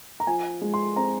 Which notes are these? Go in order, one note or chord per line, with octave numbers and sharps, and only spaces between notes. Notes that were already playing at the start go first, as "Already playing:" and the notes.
A#5
F3 G#5
G#3
C6
C4 A#5